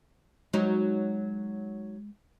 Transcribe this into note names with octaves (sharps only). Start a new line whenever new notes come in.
F#3 G#3 D#4